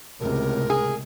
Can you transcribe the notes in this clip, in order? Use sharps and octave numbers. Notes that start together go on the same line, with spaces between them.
C#2 A2 C3 A#4
G#4